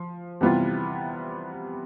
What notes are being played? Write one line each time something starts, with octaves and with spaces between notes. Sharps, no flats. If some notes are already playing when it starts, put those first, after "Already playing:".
Already playing: F3
C3 E3 G3 B3 F4